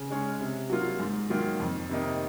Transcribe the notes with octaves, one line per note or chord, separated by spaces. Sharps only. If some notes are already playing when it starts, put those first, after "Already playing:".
Already playing: C#3
G#3 C#4
C3
F#3 A#3 F4
G#2
D#3 F#3 A#3 F4
F2
C3 D#3 A#3 D#4